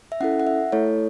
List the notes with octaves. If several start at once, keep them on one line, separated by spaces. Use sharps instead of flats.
E5
C#4 E4 A4 F#5
F#5
E5
A3 E4 A4 C#5